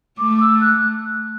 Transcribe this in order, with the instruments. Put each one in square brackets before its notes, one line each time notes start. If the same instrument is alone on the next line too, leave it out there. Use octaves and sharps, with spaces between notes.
[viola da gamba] A3 [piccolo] D6
[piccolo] E6
F#6